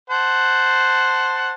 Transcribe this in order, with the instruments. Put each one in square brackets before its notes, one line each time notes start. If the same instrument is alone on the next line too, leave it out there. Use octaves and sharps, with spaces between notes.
[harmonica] C5 F#5 A5